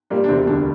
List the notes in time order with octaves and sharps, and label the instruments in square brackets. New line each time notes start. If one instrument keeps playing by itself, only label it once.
[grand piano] A#2 A#3 [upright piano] G3
[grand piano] D4
[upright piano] E1 [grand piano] C3 C4
[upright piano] D2 [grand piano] D3 D4